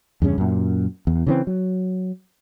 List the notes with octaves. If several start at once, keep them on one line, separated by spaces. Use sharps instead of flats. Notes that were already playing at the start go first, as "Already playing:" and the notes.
E2 G2 C#3 C#4
F#2 A#2
E2
C#3 E3 C4
F#3